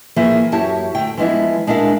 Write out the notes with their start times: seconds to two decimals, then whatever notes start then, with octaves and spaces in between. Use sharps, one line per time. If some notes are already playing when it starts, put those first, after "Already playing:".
0.16 E3 F3 A#3 E4 G#4 E5
0.52 F#2 E4 F#4 G4 C#5 A5
0.95 D2 G5
1.17 E3 F3 G#3 B3 E4
1.67 G#3 D4 E4 A#4 F5